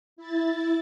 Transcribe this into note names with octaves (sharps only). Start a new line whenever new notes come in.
E4 A6